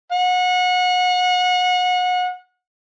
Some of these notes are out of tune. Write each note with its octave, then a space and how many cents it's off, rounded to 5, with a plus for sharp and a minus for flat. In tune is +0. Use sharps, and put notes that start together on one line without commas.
F#5 -30